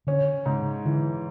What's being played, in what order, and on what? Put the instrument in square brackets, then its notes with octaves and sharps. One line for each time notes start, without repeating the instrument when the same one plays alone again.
[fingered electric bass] D3 [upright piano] C#4
[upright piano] G#2 [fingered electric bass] C#3
[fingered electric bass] D3 [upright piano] E3